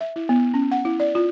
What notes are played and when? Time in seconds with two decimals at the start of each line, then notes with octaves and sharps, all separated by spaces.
0.01 E5
0.16 E4
0.29 B3
0.54 C#4
0.71 F#5
0.85 E4
1.00 D5
1.15 F4